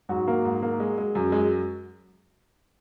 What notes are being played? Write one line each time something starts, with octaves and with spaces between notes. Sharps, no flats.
G#2 F#3 F#4
A#3
G#2
A#3
G#3
G#3
F#2
G#3